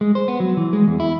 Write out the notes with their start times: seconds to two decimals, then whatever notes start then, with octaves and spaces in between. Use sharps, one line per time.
0.01 G#3
0.15 C5
0.28 B3
0.40 F#3
0.57 E3
0.73 G#3
0.88 E2
1.00 E4